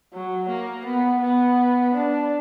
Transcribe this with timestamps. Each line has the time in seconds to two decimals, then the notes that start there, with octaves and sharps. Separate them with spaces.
0.13 F#3
0.50 A#3
0.86 B3
1.22 B3
1.95 D4